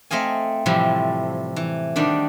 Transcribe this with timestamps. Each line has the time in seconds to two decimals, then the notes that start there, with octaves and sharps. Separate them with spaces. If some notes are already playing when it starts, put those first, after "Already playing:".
0.11 A3 C4 D#5 F5 G#5
0.66 A2 C3 E3 F3 G3
1.56 E3
1.96 D#3 G3 D4 F#4